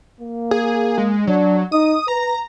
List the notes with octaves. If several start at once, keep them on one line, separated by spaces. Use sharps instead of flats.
A#3
G#4
G#3
F#3 D4
D#4 D#6
B4 A#5